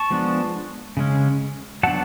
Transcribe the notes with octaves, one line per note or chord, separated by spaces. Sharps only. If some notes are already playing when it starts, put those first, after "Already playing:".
Already playing: A5 C#6
F3 G#3 B3 D4
C#3 G#3 C#4
F#3 B3 D4 F#5 A5